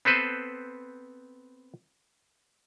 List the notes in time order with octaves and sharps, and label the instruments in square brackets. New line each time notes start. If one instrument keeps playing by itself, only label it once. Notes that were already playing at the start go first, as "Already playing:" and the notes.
[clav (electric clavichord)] B3 C4 A4 B4 C5